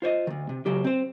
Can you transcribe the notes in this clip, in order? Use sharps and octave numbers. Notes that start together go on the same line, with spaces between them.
F4 C5 C#5 D#5
D2 D#3
C3
C#3 F#3 G4
C4 C5